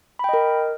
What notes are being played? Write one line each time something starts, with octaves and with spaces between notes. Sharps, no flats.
A#4 D#5 G5 B5